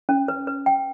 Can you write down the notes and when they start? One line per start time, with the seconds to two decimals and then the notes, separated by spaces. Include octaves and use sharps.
0.09 C#4
0.28 B4
0.47 B4
0.66 G5